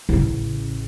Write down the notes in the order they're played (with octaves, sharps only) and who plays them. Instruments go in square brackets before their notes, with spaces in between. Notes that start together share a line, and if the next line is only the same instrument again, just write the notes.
[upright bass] A1 C#3